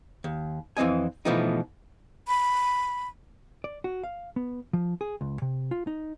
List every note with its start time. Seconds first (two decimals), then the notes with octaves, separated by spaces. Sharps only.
0.24 D#2
0.77 F2 E3 C4 D#5 G#5
1.25 B2 E3 F3 A3 B3 D#4
2.28 B5
3.64 D5
3.84 F#4
4.04 F5
4.36 B3
4.73 F3
5.01 G#4
5.21 C#2
5.42 C3
5.71 F4
5.87 D#4